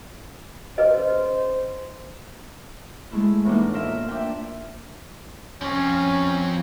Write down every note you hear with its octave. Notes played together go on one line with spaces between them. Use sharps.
C#3 B4 C5 D#5
G#3 A3 E4
A2 E3 A#3 B3 D4 D#4
F4 A#4 D#5 E5
D4 E5 G5 A5
F3 C4 C#4